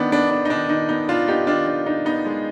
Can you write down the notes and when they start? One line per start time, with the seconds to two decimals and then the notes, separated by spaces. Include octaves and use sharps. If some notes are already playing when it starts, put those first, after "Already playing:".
Already playing: D#3 B3 D4
0.12 B3 D4
0.30 D4
0.45 D#4
0.50 D#3 D4
0.69 D#3 D#4
0.89 B3 D#4
1.09 D4 F4
1.28 B3 D#4 G4
1.47 D#3 D4 F4
1.67 D4
1.86 D4 D#4
2.05 B3 D#4
2.26 G#3